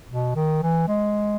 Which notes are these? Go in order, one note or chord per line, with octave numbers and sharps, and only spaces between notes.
B2
D#3
E3
G#3